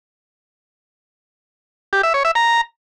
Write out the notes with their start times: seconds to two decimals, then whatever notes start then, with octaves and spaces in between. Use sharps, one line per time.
1.93 G4
2.03 E5
2.14 C#5
2.25 E5
2.35 A#5